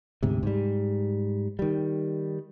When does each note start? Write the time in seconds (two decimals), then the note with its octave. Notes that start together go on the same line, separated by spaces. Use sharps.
0.23 D2 G#2 C3
0.43 G#2 G3
1.59 D#3 G3